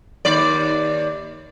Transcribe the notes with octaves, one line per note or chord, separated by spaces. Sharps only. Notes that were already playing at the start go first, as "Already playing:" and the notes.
D#2 D5